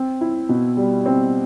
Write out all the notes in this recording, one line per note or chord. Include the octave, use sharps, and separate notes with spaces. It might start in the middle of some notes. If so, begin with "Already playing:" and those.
Already playing: C4
E4
B2
G3
C4